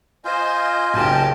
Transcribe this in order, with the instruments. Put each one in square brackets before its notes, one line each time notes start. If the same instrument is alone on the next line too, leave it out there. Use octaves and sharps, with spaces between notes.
[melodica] F4 [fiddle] C5 [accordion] D#5 G#5 G6
[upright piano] F#1 B1 [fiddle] G4 A5